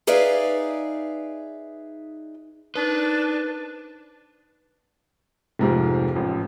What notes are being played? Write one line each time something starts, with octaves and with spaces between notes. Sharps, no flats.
D#4 G#4 B4 D5 E5 F5
D4 D#4 B4 C5
F1 G#2 C3 F3
A1 F3